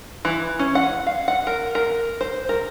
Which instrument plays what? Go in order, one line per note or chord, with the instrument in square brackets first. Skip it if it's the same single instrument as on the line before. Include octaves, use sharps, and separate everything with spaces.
[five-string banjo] E3
C#4
F#5
F5
F#5
A#4
A#4
C5
A#4